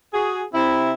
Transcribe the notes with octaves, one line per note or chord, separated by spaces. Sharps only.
F#4 G#4
C3 C4 E4